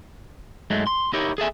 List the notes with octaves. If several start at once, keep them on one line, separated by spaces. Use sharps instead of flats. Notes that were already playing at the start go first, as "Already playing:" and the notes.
G#2 F#3 G#3 A3
C6
D#4 E4 G4 A#4 C#5
G#4 A4 E5 G#5